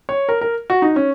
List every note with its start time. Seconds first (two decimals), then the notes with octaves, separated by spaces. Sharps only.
0.09 C#5
0.29 A#4
0.41 A#4
0.70 F#4
0.82 D#4
0.96 C#4